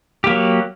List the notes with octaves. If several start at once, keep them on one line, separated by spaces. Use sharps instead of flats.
F#3 A#3 G4